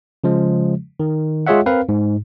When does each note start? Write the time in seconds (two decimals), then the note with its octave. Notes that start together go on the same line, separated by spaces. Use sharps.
0.24 C#3 F3 G#3
1.00 D#3
1.47 G#3 F4 G#4 C#5 E5 F#5
1.66 C4 A#4 B4 F5
1.89 G#2